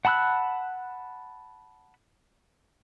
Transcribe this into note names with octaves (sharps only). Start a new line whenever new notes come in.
F#5 A5 B5 E6 F#6